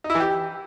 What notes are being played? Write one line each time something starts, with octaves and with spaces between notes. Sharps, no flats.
D#4
E4
E3
G4